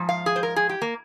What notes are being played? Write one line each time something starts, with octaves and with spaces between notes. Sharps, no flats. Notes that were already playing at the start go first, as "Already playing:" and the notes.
Already playing: G#2 F3
F5
G#4
C5
A#4
G#4
G4
A#3